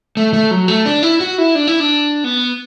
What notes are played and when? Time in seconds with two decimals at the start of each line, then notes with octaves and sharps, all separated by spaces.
0.17 A3
0.33 A3
0.51 F#3
0.68 A3
0.86 D4
1.03 E4
1.21 F#4
1.38 E4
1.55 D4
1.67 E4
1.80 D4
2.24 B3